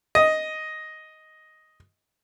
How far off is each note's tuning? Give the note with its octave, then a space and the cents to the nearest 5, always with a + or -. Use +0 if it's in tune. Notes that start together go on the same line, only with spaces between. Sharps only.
D#5 +5